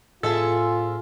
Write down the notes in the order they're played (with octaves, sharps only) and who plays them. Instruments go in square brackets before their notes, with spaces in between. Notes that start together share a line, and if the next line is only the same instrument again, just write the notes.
[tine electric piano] A2 [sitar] C4 G#4 E5 [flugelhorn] F4 [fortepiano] A4